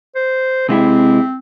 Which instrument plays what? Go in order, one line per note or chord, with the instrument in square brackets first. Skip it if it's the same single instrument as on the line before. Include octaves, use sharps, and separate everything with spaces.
[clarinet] C5
[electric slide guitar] C3 G#3 E4 [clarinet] C4